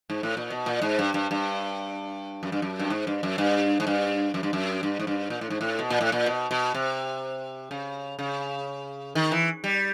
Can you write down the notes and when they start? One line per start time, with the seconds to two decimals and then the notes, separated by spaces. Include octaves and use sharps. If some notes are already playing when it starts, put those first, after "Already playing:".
0.10 G#2
0.23 A2
0.37 A#2
0.50 B2
0.66 A#2
0.82 G#2
0.99 G2
1.14 G2
1.31 G2
2.43 F#2
2.52 G2
2.62 F#2
2.80 G2
2.90 G#2
3.07 G2
3.23 F#2
3.38 G2
3.80 G#2
3.87 G2
4.34 F#2
4.43 G2
4.53 F#2
4.83 G2
4.99 G#2
5.07 G2
5.30 A#2
5.41 A2
5.50 G#2
5.61 A2
5.79 B2
5.90 A#2
6.01 A2
6.12 A#2
6.26 B2
6.51 B2
6.74 C3
7.71 C#3
8.19 C#3
9.15 D#3
9.32 E3
9.64 G3